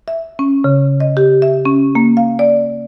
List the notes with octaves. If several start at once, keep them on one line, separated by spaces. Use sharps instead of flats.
E5
C#4
C#3
D#5
G4
E5
C#4
A#3
F5
D5